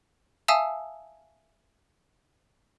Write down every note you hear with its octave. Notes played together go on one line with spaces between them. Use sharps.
E5 F5 G#5 A5 D#6 E6